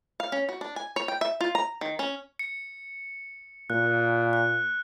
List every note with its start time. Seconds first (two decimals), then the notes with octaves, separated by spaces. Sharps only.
0.20 F5
0.32 C#4
0.49 F#4
0.61 D4
0.76 G#5
0.96 C#5
1.08 G5
1.21 E5
1.41 F4
1.55 A#5
1.81 D#3
1.99 C#4
2.39 C#7
3.70 A#2 F#6
4.33 F#6